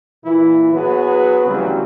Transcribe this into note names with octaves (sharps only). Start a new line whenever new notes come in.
A#2 E3 E4
F#3 B3 G#4 B4
D2 C#3 E3 F#3 G3 C4